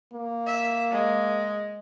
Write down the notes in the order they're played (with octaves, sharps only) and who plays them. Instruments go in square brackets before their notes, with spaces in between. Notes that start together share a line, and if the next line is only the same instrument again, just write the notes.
[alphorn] A#3
[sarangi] E5
G#3